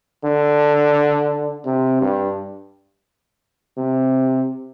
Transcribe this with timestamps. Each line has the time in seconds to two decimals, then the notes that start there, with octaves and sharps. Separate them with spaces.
0.25 D3
1.65 C3
2.01 G2
3.77 C3